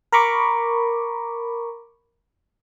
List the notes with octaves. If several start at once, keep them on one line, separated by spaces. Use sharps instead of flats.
A#4 A#5 B5 C#6 D6